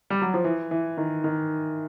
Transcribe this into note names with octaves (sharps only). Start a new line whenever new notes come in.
G3
F#3
F3
E3
E3
D#3
D#3